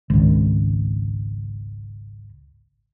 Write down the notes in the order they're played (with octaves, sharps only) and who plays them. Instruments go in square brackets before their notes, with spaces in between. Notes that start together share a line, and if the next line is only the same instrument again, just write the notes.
[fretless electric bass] G#1 C#2